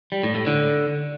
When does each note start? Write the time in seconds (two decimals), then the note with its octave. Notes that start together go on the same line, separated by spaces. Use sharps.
0.12 G3
0.23 A2
0.35 A2
0.47 D3